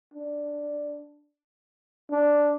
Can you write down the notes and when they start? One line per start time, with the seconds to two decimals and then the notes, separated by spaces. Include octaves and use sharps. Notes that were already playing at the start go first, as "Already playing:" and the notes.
0.14 D4
2.11 D4